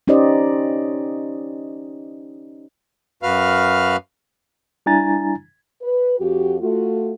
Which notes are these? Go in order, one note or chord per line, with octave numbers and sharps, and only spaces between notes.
C#4 D#4 G4 C5 D5 D#5
F#2 F#4 B4 F5 F6
G3 D4 E4 G#5 A#5 A6
B4
F2 F#4 G4
A3 F4 F#4